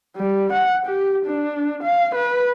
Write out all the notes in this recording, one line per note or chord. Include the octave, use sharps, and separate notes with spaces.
G3
F#5
G4
D4
F5
B4